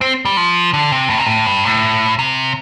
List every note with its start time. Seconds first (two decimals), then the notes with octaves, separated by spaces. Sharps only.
0.01 C4
0.25 G3
0.37 F3
0.74 D3
0.92 C3
1.10 A2
1.18 C3
1.26 A2
1.46 G2
1.65 A2
2.19 C3